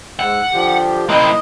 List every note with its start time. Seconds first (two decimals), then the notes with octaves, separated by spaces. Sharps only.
0.19 G#2 F#5 E6
0.53 D3 F3 G4
1.09 A#3 E4 D#5 G5 C6 F#6